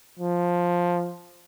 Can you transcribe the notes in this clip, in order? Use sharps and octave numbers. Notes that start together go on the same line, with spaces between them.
F3